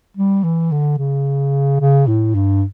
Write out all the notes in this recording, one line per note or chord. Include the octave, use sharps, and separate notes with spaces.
G3
E3
D3
C#3
C#3
A2
G2